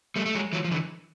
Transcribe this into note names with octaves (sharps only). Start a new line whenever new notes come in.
G3 A3
A3
F#3 G#3
E3 F#3
F3
D3 E3